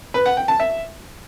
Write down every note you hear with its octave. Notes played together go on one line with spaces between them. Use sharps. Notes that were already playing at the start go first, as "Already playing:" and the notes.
B4
F#5
G5
A5
E5